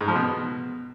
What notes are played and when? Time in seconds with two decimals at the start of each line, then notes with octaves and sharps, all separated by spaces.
0.01 G#2
0.08 F3
0.15 B2